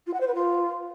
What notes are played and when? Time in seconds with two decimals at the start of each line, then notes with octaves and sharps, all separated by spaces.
0.06 F4
0.13 F#5
0.20 C5
0.27 B4
0.34 F4